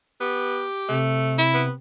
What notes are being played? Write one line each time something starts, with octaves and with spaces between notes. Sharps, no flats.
B3 G4
C3 A3
E4
B3